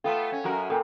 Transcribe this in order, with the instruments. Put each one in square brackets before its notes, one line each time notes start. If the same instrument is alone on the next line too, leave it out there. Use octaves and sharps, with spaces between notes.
[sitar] A3 B3 F4 [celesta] A4 F5 G5
[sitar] C#4
F#2 F#4 A#4
[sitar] A#2 [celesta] A4 A#4 G5